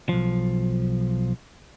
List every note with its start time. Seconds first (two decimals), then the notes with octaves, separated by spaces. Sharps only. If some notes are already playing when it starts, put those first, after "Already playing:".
0.09 B1 F3